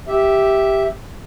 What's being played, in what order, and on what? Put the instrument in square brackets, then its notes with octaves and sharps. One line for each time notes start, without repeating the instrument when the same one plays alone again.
[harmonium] G4 E5